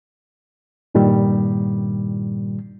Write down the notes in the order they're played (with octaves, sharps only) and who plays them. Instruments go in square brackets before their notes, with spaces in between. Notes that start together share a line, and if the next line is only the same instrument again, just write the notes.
[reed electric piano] G2 A#2 D#3 G3